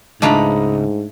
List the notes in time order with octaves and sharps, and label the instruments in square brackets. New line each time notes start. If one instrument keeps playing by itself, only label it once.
[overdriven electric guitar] C#2 [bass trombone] G#2 [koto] A3 D4 F4 [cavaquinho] D#5 A#5 B5